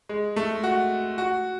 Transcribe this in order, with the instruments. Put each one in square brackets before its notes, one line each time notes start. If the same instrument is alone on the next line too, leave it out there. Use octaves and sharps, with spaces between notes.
[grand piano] G#3
A3
F#4
F#4